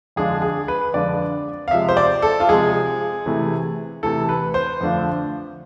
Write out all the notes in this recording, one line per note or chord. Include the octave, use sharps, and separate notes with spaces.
F2 D3 G#3 D4 F4 G#4
G#4
B4
F2 D3 G#3 D4 F4 D5
F5
C3 F3 G#3 E5
C5
D5
A4
F4
C3 F3 G#3 G#4
C3 E3 A3 E4
C3 E3 A3 E4 A4
B4
C5
F2 D3 A3 D4 F4